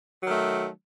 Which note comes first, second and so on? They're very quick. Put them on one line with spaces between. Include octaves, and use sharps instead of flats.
F#3 D#3 A3